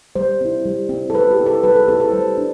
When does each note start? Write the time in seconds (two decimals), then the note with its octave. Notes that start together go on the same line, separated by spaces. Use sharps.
0.16 G3 C5
0.41 C4 E4
0.66 G3
0.89 C4 E4
1.10 A4
1.14 G3 B4
1.31 G4
1.38 C4 E4
1.46 A4
1.63 G3 B4
1.76 A4
1.88 C4 E4 A4
2.00 A4
2.12 G3 C5
2.38 D4